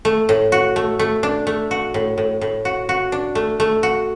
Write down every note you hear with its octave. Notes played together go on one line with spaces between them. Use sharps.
A3
A2
F#4
A3
A3
D4
A3
F#4
A2
A2
A2
F#4
F#4
D4
A3
A3
F#4